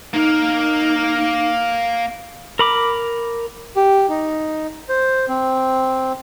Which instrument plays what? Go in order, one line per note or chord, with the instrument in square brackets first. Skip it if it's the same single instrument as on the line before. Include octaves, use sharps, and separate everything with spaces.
[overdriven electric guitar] A#3 A#4 [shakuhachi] D#4
[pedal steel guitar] A#4 B5 D6
[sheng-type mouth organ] G4
D#4
C5
C4